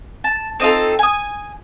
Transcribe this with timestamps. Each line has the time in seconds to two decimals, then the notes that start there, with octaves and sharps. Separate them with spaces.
0.24 A5
0.60 C4 D#4 F4 A4
0.99 G#5 D#6